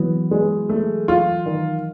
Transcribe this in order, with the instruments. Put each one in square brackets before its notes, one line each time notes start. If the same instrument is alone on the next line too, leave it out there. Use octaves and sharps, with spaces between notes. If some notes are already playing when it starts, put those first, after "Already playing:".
Already playing: [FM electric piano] E3 F#3 [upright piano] B3
[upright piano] G#3
A3
F4
D#3